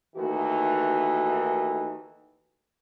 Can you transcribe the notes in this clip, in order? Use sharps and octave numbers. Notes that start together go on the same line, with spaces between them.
D#2 D#3 E3 A3 F#4